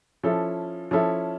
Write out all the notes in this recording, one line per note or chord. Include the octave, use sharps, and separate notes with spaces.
F3 C#4 E4 A4
F3 C#4 E4 A4